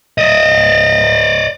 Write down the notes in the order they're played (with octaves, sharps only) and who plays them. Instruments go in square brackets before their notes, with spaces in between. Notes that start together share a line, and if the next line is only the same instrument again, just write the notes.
[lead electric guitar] D5 D#5